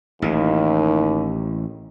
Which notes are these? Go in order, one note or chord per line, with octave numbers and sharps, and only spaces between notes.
A1 D#2 E3